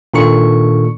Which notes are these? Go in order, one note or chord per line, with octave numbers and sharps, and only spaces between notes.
A#2 D#3 D4 A4 C#6 C#7